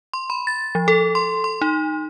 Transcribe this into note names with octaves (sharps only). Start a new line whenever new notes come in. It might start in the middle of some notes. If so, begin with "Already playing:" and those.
C6
B5
A6
F3
A4
C6
C6
D#4